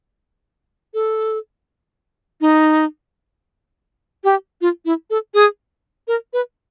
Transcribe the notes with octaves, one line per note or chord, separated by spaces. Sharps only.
A4
D#4
G4
F4
E4
A4
G#4
A#4
B4